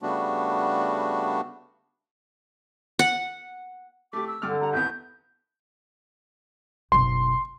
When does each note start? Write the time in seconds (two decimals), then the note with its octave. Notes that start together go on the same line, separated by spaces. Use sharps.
0.02 C#3 G3 A3 B3 D4 F#4
2.99 F#5
4.13 A3 G4 D6
4.27 E6
4.42 G2 D3 D6 F6
4.60 G3 F#5 A#5
4.73 A1 D#2 B3 G6
6.92 F#1 B1 C6